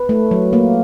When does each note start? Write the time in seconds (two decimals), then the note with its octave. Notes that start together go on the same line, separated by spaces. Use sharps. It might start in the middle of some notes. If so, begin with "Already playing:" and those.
Already playing: B4
0.09 A3
0.31 F#3
0.53 A#3